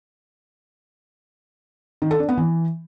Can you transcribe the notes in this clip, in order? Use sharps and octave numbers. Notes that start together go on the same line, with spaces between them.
D#3
A4
D4
B3
E3